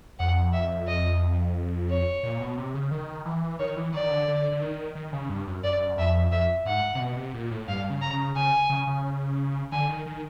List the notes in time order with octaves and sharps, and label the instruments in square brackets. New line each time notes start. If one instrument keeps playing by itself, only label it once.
[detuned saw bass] F2 [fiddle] F#5
[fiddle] E5
D#5
C#5
[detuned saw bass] A#2
B2
C3
C#3
D#3
E3
[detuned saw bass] D#3 [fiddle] C#5
[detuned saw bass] E3
[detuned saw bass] D#3 [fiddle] D5
[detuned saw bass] D3
D3
D3
D#3
D#3
C#3
G2
F#2
[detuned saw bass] F#2 [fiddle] D5
[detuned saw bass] F2 [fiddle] E5
[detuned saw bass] F2 [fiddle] E5
[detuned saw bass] G#2 [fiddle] F#5
[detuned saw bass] C3
B2
C3
A#2
A2
[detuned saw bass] G2 [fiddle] F5
[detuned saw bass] C#3
[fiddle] A#5
[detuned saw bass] C#3
[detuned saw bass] C#3 [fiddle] G#5
[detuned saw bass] C#3
C#3
[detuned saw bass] D3 [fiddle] G#5
[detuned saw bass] D#3
D#3